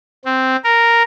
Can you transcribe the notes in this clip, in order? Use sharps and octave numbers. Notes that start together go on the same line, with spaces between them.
C4
A#4